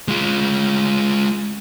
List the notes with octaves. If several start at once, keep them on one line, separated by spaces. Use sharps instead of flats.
G#3 F4